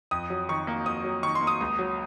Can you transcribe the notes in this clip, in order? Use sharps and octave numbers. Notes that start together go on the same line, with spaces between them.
F2 D#6
F#3
D#3 C#6
A#3
F2 D#6
F#3
D#3 C#6
C6
A#3
D#6
C#2
F#3